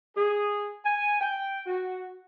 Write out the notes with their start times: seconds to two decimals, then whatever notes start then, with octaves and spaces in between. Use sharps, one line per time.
0.16 G#4
0.85 G#5
1.21 G5
1.66 F#4